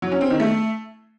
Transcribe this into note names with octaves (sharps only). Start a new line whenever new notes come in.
F#3
C#4
C4
D#3
A3